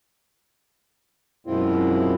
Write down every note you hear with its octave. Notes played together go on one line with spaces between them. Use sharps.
F#2 B2 G#3 C4 E4 F4